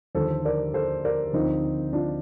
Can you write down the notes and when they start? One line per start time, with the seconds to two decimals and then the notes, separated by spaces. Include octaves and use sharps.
0.15 D#2 D3 F3 A4 C5
0.45 A#4 D5
0.74 A4 C5
1.05 A#4 D5
1.33 D2 D3 F3 C4 D#4
1.93 D4 F4